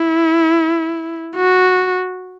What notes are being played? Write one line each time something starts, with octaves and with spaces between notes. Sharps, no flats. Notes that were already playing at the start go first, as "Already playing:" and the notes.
Already playing: E4
F#4